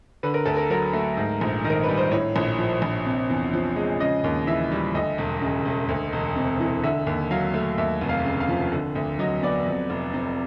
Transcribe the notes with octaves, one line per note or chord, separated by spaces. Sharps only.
D3 B4
A#4
D2 A4
A#4
F#3 A#4
A3
G#2
A#1
D#3
A#4
G3 B4
C5
A2 C#5
A#1
F3
A#1
C3
E2
F3
G#3
C#3 D#5
D#2
E3 E5
G3
D2 D#5
E1
C#3
E1
D2
E1
C3
E3
D3 E5
D#2
F#3 F5
A3
D#2 E5
F1
F5
C#3
F5
F3
D3
D2
F#3 D#5
B3 D5
F2
F1
C3